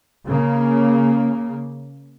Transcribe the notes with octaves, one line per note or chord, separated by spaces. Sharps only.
C#3 A#3